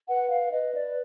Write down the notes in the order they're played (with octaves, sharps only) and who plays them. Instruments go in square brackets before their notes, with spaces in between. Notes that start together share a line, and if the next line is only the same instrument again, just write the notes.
[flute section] B4 F#5
F5
B4 D#5
D5